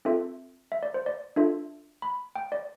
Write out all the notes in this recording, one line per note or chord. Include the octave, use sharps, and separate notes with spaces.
C4 F4 A4 E5
E5
D5
C5
D5
D4 F4 A4 E5
B5
G5
D5